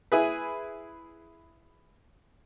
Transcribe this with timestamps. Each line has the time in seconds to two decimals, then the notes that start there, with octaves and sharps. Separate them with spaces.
0.12 E4 G#4 B4